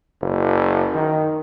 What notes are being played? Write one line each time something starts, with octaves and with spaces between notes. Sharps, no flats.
F#1
D#3